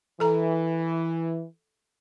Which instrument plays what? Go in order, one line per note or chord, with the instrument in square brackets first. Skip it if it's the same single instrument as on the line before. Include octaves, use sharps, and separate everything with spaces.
[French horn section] E3 [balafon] A4 A#5